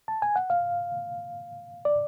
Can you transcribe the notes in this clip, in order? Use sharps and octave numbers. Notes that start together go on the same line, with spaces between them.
A5
G#5
F#5
F5
D5